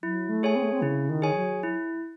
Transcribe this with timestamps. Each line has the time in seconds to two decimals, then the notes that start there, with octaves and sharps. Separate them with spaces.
0.03 F#3 E4
0.29 A3
0.43 G#4 C#5 G#5
0.56 C4
0.64 A3
0.72 C4
0.82 C#3 E4
1.09 D#3
1.22 G#4 C#5 G#5
1.35 F#3
1.63 E4